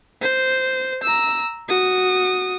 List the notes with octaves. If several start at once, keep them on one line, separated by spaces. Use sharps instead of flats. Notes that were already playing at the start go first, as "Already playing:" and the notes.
C5
A#5 E6
F#4 D#6